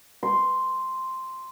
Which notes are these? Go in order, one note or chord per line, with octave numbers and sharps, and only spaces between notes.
C6